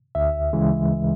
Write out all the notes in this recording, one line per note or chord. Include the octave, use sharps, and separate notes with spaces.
D2 E5
C#3 E3 G#3